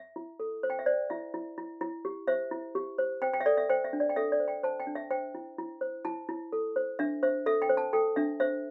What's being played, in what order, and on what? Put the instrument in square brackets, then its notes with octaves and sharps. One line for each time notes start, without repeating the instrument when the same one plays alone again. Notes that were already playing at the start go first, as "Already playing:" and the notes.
Already playing: [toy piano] E5
E4
A4
C5
G5
E5
C5 D5
E4 E5
E4
E4
E4
G4
C5 E5
E4
G4
C5
C5 G5
G5
E5
A4 D5
E5
C5 G5
E5
D4
D5
G5
A4 E5
D5
C5
G5
C5 A5
G5
D4
E5
C5 G5
E4
E4
C5
E4 A5
E4
A4
C5
D4 E5
C5 E5
A4 E5
G5
C5
A5
A4 G5
D4 E5
C5 E5